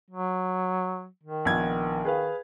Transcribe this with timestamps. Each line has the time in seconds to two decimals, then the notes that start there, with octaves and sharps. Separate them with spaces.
0.10 F#3
1.23 D#3
1.45 A#1 B3 G#6
2.05 G#4 B4 F5